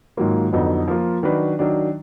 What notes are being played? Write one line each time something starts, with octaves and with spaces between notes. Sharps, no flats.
G#2 D#3 F#3 A#3 F4
F2 D3 F#3 B3 D#4
F3 A#3 F4
D#3 F#3 D4 F#4 B4
D#3 F#3 D4